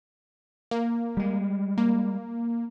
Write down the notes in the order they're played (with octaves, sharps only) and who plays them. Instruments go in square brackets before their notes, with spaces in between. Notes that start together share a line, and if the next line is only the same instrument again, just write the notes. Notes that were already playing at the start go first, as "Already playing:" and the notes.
[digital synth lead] A#3
[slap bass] G3 G#3
[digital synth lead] A#3